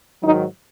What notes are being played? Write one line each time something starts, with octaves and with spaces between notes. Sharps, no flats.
G#2 D#3 F#3 D#4